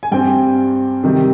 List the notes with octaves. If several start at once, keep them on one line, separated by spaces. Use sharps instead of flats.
G#5
G2 G3 C4 G5
C3 D#3 G3